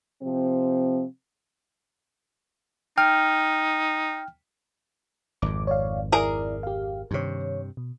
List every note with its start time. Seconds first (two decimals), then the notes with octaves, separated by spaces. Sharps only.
0.22 C3 F3 C4
2.98 D#4 G5 F6
5.42 G#1 F2 D6
5.67 C#5 D5 F5
6.12 E4 G#4 A#4 D5 A#5
6.63 G4 F5
7.11 G2 C3 D#3 C#5
7.77 B2